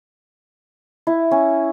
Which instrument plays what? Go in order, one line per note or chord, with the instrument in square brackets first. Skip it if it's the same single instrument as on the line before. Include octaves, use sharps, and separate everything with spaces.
[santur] E4
C#4